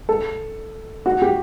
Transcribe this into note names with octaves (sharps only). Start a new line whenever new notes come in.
A4
F#4
G4